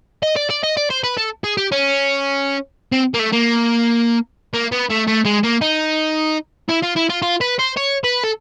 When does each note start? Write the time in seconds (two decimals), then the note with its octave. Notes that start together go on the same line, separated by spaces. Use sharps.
0.23 D#5
0.36 D5
0.50 D5
0.64 D#5
0.77 D5
0.90 C5
1.04 B4
1.18 A4
1.44 G#4
1.57 G4
1.72 C#4
2.92 C4
3.14 A#3
3.20 A3
3.33 A#3
4.54 A#3
4.72 B3
4.90 A3
5.08 A3
5.25 G#3
5.44 A#3
5.61 D#4
6.69 E4
6.83 F4
6.96 E4
7.10 F4
7.23 F4
7.41 B4
7.59 C5
7.77 C#5
8.04 B4
8.24 A4